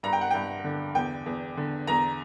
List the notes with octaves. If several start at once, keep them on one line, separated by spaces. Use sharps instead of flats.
G2 A#5
G5
F#5
G2 G5
D3
E2 G5
E2
D3
E2 A#5